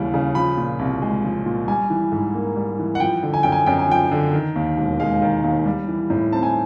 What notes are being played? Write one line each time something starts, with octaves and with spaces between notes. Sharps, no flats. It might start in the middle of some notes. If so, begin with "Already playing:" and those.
Already playing: D#2 C#3 E3 G3
C#3
F3 B5
A#2
C2
G#3
F3
A#2
G3 G#5
E3
G#2
A#3
G3
E3
F#5
F3 G5
D3
G#5
F#2 G5
G#5
F#2 G5
G#5
F3 G5
D3
D#3
D#2
E1
G#3 F5
D#3
D#2
G3
E3
A2
C4 A5
G#5